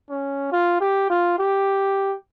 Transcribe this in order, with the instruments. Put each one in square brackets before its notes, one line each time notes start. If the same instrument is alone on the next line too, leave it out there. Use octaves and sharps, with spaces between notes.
[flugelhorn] C#4
F4
G4
F4
G4